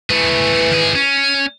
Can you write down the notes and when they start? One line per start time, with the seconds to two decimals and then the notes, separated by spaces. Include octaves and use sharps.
0.10 E3 A3 G#4
0.71 D#3 G#4
0.95 C#4